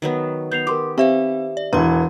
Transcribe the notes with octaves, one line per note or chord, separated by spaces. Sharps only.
D#3 F#3 B3
B3 G6 C7 F7
G4 A#4 C6 D6
C4 G4 C5 E5 F5 B5
D5
E1 E3 B4 C6